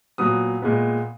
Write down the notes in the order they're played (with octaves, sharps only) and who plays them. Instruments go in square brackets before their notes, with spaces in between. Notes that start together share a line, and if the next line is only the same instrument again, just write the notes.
[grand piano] A#2 F#3 B3 D#6
A#2 G#3 B3